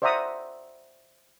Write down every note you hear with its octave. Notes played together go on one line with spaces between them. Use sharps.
C5 D5 E5 F#5 A#5 D#6